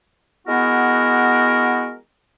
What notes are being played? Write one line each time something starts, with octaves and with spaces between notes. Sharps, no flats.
G#3 B3 E4 F#4 A#4